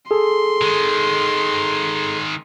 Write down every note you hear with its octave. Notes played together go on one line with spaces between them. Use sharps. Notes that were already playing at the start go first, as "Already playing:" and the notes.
G#4 A4 C6
D#3 G#3